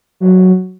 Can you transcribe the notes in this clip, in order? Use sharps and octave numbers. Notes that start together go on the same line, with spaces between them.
F#3